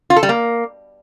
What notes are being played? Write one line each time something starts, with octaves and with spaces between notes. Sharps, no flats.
F4
A4
G3
A#3